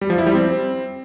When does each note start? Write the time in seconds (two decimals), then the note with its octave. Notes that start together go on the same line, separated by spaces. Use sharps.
0.01 G3
0.10 F3
0.18 E4
0.26 G3
0.35 C4